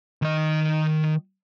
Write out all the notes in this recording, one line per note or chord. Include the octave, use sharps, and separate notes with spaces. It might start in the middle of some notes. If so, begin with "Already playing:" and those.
D#3 D#5